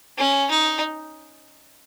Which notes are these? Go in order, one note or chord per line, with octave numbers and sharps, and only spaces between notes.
C#4
D#4